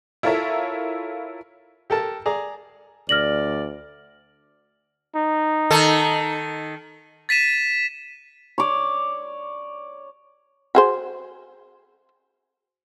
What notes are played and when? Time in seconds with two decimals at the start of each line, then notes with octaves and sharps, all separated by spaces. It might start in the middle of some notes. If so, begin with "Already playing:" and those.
0.23 E4 F4 A4 A#4 C#5 E5
1.90 G4 A4 A#4 A5
2.26 G#4 D5 A#5
3.09 D2 D5 F6 A#6 F#7
5.16 D#4
5.70 D#3 A4
7.29 A6 B6 D#7 E7
8.58 C#5 D5
10.75 F#4 G#4 C5